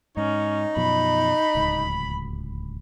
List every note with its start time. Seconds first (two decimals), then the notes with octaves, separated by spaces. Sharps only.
0.17 G#2 C#4 D#4
0.76 F#2 B2 F3 B5
1.55 D1 C#2